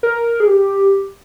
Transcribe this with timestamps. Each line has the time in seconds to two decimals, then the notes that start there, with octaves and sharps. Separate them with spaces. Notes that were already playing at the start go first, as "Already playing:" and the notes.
0.03 A#4
0.40 G#4
0.47 G4